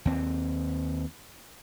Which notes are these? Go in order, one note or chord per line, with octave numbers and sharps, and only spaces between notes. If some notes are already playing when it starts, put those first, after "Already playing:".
D#2 C4